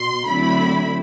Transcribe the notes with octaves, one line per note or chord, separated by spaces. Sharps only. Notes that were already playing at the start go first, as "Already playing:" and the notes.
Already playing: B2 C6
D3 F#3 A3 C4 E4 B5